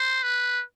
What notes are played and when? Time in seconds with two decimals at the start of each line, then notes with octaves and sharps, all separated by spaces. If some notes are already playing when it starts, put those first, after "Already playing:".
Already playing: C5
0.23 B4